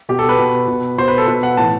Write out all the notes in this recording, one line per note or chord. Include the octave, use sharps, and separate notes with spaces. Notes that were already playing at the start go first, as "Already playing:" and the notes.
B2 G4
A4
B4
B2
B2
B2 C5
B4
A4
B2 B4
F#5
A2 E3 A5